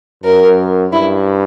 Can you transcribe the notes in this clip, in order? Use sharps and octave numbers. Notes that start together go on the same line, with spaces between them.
F#2 A#4
G2 E4